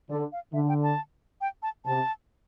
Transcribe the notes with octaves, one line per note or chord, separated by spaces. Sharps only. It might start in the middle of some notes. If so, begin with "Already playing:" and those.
D3 D5
F5
D3 E5
G5
A5
G5
A5
C3 A5